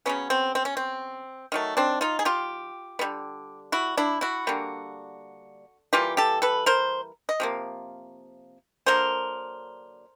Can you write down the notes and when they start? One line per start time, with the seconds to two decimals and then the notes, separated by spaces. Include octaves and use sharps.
0.06 C#3 F#3 B3 C#4
0.30 C4
0.55 C4
0.65 C#4
0.77 C4
1.52 D#3 F#3 A3
1.77 C4 D4
2.01 D#4 F4
2.19 G#4
2.25 F4 G4
2.99 D3 G3 B3
3.72 E4 F#4
3.97 D4 E4
4.21 E4 F#4
4.47 D3 G3 A#3
5.93 E3 G3 A#3 F4 G4
6.17 G4 A4
6.42 A4 B4
6.66 A#4 C5
7.29 D#5
7.40 C3 F3 A#3
8.86 D3 F#3 A#3 A#4 C5